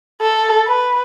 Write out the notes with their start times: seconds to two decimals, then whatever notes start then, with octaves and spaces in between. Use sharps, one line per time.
0.21 A4
0.67 B4